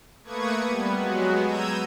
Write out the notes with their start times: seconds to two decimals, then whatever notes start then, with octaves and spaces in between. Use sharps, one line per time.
0.24 A3 A#3 B4 C#6 D#6 G#6
0.66 G3 B3
0.95 F#3 G#3 B3 F#4
1.44 A#5 E6 G6 G#6 D#7